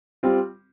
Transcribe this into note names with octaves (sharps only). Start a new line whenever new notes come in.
G3 C4 F4